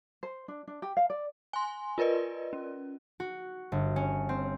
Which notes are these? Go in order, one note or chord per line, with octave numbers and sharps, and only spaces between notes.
C5
D4
D4
G4
F5
D5
G#5 C6
F4 A#4 B4 D5 D#5
C#4
F#4
G1
C#4
C4